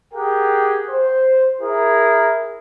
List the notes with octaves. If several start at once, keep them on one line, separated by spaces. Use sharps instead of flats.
G4 G#4 A#4 F#5 G5
C5
E4 G#4 A#4